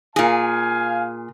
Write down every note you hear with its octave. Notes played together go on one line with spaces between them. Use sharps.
A#2 G#4 F5 G#5